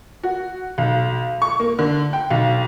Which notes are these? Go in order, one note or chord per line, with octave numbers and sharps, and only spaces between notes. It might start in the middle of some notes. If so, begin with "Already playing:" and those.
F#4
B1
C#6
A#3
D3
G5
B1